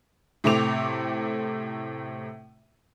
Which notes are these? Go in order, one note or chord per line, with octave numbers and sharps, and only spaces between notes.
A2 C3 A3 C4 D6 F7